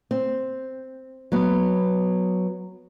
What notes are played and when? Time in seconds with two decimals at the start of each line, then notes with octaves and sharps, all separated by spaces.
0.11 C4
1.32 F#3 B3